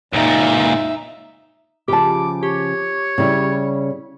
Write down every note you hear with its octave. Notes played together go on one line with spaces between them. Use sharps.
C#2 A#2 D#4 E5
C#3 F3 G4 A5 D6
G4 C#5
C#3 G3 E4